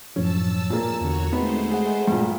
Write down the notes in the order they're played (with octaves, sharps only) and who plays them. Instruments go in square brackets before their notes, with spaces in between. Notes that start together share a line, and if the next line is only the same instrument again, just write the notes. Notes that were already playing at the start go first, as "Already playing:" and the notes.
[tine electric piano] F#2 A2 F3 [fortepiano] C#4 [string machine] A5 E6
[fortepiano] A#2 A#3
[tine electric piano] E2 D3 [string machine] F#4 C#5
[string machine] G#3 A3 C5 [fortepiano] B3 [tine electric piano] C4 D#4
[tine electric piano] G#4 F#5
[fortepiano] G2 A#2